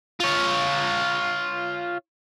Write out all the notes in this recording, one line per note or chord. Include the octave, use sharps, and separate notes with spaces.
F4 C#5